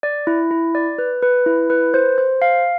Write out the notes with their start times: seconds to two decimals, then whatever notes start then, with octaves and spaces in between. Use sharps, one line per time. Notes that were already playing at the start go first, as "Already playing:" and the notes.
0.03 D5
0.27 E4
0.51 E4
0.75 D5
0.98 B4
1.22 B4
1.46 E4
1.70 B4
1.94 C5
2.18 C5
2.42 F5